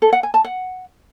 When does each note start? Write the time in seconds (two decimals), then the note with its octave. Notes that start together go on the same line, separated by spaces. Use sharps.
0.02 A4
0.13 F#5
0.23 G#5
0.34 A5
0.45 F#5